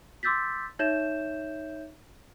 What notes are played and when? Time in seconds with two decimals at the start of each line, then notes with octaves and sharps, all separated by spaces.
0.23 C6 D6 E6 G6 A6 B6
0.79 D#4 C#5 E5 G6 E7